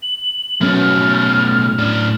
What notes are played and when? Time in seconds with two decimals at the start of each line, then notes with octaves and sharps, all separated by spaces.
0.03 F#7
0.61 B2 F#3 A3 B3 C#4 F6
1.79 A2 D4